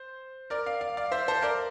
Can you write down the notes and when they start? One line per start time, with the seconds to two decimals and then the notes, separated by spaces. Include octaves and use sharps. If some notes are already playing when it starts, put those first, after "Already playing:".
Already playing: C5
0.50 A#4 D5
0.66 D5 F5
0.81 D5 F5
0.97 D5 F5
1.12 C5 E5
1.28 A4 C5
1.42 A#4 D5